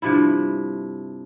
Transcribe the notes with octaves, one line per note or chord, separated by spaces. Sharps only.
G2 C3 F3 E4